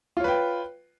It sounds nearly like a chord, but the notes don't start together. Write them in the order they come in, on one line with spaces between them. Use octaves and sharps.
F4 C#5 B4 G5